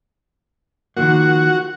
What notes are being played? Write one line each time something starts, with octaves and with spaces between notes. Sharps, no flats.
D#3 F3 A#3 F#4